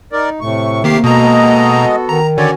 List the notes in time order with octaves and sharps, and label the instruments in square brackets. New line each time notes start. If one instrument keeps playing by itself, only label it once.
[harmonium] D#4 [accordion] A#4 D5
[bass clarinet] A2 [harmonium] C3 A3 [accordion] C#6
[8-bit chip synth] D#3 G4 C7 [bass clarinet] A#3
[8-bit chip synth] B2 A#5 [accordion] G#3 D#5 [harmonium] B3 F#4 A4
[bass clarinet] D#3 [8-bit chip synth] A#5
[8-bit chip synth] D3 [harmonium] C#4 F#4 G#5 [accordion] C#5 D5